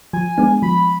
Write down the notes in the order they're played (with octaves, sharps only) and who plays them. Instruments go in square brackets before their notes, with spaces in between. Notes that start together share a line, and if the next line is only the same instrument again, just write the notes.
[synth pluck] F3 [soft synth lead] G#5
[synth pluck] G#3 B3 D4
[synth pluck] F3 [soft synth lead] B5